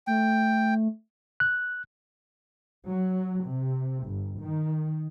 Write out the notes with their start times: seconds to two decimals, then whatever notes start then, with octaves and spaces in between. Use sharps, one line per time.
0.07 A3 G5
1.40 F#6
2.85 F#3
3.45 C3
4.04 G1
4.40 D#3